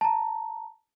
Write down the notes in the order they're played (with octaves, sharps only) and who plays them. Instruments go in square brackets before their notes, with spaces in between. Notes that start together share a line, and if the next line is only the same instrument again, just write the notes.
[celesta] A5 A#5